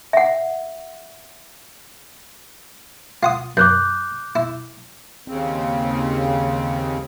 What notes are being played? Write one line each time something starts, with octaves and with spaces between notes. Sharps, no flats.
E5 F#5
F4 F#5 D#6
F#2 D6 F#6 G6
E4
D#2 C#3 C4